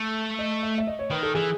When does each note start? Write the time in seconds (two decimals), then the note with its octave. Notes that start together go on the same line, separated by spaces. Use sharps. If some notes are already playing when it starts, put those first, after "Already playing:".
Already playing: A3
0.39 D#5
0.63 E5
0.78 E5
0.87 D#5
0.99 C#5
1.10 D#3 B4
1.23 A4
1.35 E3 G#4